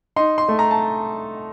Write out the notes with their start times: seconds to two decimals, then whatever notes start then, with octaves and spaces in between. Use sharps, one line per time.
0.16 D#4 C6
0.38 C6
0.49 A3
0.59 A#5
0.71 A5